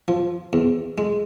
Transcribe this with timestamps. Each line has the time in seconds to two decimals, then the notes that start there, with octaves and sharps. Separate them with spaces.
0.08 F3
0.53 E2
0.98 G#3